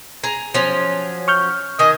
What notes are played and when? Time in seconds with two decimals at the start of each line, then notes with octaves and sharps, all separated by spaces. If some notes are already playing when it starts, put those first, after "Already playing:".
0.23 G#4 A#5
0.54 F3 F#3 C#4
1.28 C#6 F6 G6
1.79 D#3 D#5 G#5